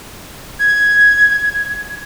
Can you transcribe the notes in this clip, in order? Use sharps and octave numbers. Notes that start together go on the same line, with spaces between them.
G#6